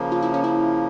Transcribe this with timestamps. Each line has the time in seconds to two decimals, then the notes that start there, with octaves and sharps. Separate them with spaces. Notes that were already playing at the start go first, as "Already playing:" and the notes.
Already playing: C#3 F3 A#3
0.12 F4
0.22 E4
0.34 C#4
0.44 E4